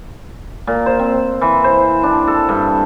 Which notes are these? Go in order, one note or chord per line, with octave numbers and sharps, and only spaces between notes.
A#2
C5
C4
E3
C5
D4
A4
G2